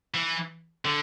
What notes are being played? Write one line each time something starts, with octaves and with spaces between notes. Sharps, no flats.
E3
D3